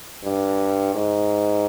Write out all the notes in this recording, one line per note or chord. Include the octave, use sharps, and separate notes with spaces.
G2
G#2